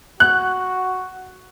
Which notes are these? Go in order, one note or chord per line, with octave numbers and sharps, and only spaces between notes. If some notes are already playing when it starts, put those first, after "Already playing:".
F#4 F#6